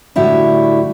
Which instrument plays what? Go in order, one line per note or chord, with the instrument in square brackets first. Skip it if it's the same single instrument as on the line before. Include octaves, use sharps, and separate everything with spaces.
[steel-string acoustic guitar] A2 D3 G3 E4 F#4